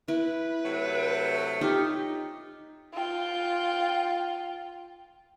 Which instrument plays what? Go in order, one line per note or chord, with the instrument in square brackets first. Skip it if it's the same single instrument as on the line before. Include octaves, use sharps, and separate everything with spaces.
[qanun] E4 [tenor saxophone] B4
[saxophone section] C3 F#3 A3
[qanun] D#4 F4 [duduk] G4
[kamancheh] F4 G5